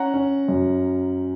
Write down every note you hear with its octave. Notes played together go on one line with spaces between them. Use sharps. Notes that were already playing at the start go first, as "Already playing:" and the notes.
Already playing: C#4 F#5 A#5
C#4
F#2